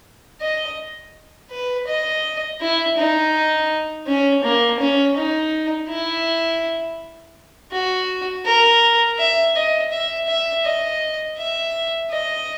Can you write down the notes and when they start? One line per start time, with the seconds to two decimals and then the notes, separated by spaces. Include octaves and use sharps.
0.42 D#5
1.50 B4
1.87 D#5
2.61 E4
2.97 D#4
4.07 C#4
4.43 A#3
4.80 C#4
5.16 D#4
5.89 E4
7.72 F#4
8.45 A#4
9.18 E5
9.55 D#5
9.91 E5
10.27 E5
10.64 D#5
11.38 E5
12.11 D#5